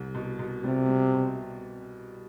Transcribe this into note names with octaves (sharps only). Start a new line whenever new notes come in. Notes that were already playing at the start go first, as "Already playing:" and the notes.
Already playing: C2
B2
B2
C3 G3
G3
B2